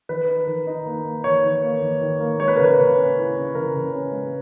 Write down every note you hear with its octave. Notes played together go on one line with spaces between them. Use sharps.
D#3 B4
D#4
D#3
D#4
A#3
A#3
D#3 C#5
D#3
A#3
D#3
D#3
A#3
G#3 C#5
B4
C#3 A#4
B4
C#3
C#4
E4
C#4
C#3 A#4
C#3
C#4
G#3